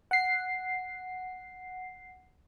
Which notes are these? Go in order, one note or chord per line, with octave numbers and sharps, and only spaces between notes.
F#5 C7